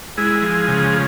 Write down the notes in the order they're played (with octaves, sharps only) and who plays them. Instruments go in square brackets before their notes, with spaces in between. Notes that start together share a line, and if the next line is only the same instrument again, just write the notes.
[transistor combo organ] G#3 E4 G#4
F3
C#3